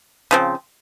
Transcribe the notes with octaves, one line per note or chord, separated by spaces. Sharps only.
C#3 F3 C4